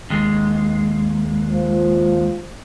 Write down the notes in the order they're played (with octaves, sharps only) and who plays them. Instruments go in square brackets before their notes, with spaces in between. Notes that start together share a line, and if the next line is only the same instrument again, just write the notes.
[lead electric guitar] D#2 G#3
[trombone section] F3